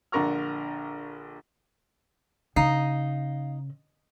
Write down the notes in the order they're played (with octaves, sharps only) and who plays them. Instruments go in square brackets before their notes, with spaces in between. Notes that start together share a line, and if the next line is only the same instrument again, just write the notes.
[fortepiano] A#1 D3 A#4 A#5 C#6 F6
[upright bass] C#3 [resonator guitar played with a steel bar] D#4 [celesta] F5 C7